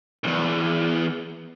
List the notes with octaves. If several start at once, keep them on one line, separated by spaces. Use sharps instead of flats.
B1 E2